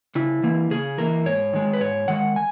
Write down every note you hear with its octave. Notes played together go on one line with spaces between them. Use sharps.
C#3 E4
E3 A#3
C#3 G#4
E3 A#3 A#4
G#2 C#5
D#3 G#3
B4
G#2 C#5
D#3 G#3 F#5
G#5